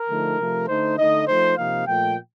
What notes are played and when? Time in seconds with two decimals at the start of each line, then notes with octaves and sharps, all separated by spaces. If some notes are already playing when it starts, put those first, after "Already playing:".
Already playing: A#4
0.09 D3 F3 A3 D#4
0.39 C3 F3 A3
0.68 D3 A3 D#4 C5
0.98 D3 A3 D#4 D#5
1.27 F3 A3 D#4 C5
1.57 C3 F3 A#3 D#4 F5
1.86 A#2 F3 A3 G5